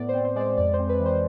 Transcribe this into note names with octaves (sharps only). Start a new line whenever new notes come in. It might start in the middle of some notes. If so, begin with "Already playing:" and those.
Already playing: A2 B3 D5
C4 C5
C5
G#3 C5 D5
F2 D5
C5
C4
B4
E3
C5